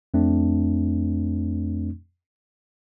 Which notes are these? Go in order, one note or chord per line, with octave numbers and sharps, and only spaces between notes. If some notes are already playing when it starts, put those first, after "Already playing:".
F2 A3 C4 D4